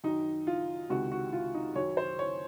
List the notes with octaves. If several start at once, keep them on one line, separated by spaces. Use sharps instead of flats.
F#2 D#3 D#4
F4
C#2 C3 D#3 F#4
F#4
F4
D#4
F#2 D#3 C#5
C5
C#5